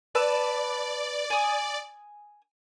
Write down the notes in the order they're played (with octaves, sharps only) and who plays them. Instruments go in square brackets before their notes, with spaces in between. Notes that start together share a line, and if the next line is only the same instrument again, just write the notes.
[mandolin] B4 A5 E6 [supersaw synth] D5
[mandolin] G#5 D#6